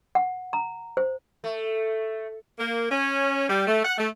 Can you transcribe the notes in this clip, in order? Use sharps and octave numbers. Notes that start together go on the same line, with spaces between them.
F#5
A#5
C5
A3
A#3
C#4
G3
A3
F#5
A3